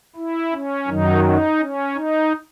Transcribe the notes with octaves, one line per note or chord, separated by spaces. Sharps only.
E4
C#4
F#2 D#3 F#3 D#4
D#4
C#4
D#4